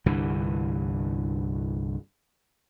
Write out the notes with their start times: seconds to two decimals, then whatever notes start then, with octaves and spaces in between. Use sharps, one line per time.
0.06 C2 G2 D3 E3